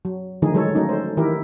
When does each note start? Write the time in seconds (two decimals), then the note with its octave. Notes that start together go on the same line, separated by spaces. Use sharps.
0.05 F#3
0.42 D3 D#3 F3 A3 D#4 G#4
0.54 F#3 G#3 A4 C#5
0.75 F#3 A3 C#4 D#4
0.89 A4 C5
1.17 D#3 E3 E4 G4 A#4